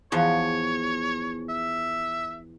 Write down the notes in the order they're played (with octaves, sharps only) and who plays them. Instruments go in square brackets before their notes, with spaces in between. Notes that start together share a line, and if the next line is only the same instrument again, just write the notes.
[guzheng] E2 F3 [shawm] C#5
[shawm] E5